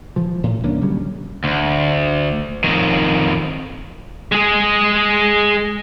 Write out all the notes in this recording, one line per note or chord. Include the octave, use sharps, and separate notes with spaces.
E3 F3
A2 E3
C2 A#3 C#4 D4
D3 F#3 G3 C#4
D2
F2 D#3
G#3 G#4